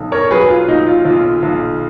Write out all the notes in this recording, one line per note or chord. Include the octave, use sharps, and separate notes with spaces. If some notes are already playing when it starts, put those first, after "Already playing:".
Already playing: B1
A#4 C#5
F#3 G#4 B4
F4
A#2 D#4
F4
B1 F4
B1